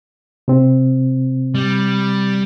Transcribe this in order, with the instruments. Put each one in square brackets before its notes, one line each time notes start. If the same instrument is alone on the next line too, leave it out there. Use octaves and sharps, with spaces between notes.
[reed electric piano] C3 C4
[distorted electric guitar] G3